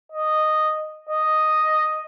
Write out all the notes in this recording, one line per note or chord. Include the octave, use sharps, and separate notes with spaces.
D#5
D#5